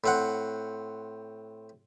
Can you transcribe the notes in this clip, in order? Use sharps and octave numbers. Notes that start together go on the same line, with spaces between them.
A2 C4 F#5